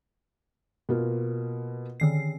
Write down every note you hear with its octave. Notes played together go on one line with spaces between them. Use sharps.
B2 A#3 F4
D3 D#3 C7